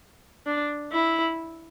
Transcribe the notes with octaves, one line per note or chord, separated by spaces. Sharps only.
D4
E4